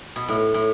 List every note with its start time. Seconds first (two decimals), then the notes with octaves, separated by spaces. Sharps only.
0.16 B2
0.28 A2
0.54 A2